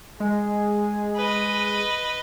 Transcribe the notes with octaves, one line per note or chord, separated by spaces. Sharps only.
G#3 G#4
B4 D#5